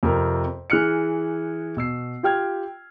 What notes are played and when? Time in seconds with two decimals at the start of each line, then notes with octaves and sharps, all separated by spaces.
0.03 F2 C3 A#4
0.70 E3 G#4 F6 F#6 C#7
1.77 B2 E6 C7
2.23 F4 G4 G5 F6 G#6